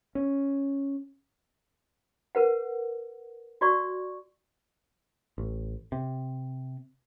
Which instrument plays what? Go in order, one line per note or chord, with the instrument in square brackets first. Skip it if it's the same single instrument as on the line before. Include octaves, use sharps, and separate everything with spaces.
[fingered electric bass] C#4
[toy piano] A#4 B4 F#5
F#4 D5 C#6
[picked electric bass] A1
C3